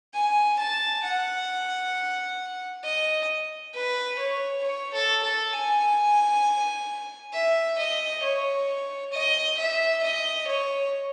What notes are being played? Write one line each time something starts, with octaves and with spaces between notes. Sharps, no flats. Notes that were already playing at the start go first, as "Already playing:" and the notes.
G#5
A5
F#5
D#5
B4
C#5
C#5
A4
A4
G#5
E5
D#5
C#5
D#5
E5
D#5
C#5